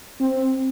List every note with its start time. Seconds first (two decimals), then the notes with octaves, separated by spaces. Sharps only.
0.20 C4